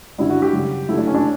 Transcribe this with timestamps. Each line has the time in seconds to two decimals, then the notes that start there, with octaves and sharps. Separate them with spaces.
0.18 G2 D3 G3 E4
0.30 F#4
0.42 G4
0.53 F#2 C#3 G3
0.89 F#2 D3 A3 E4
0.98 D4
1.07 C#4
1.15 D4